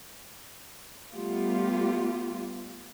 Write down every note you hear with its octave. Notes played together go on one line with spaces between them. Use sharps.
G3 A3 B3 F4 G4